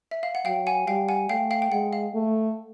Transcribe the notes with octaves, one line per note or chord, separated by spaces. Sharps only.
E5
F5
F#5
F#3 F5 G5
F#5 G#5
G3 F5 G5
F#5 G#5
A3 F5 G5
F5 G5
G5
G#3 F#5
F5
A3